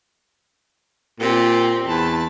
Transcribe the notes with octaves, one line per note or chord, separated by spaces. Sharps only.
A#2 C4 G4
E2 A5 B5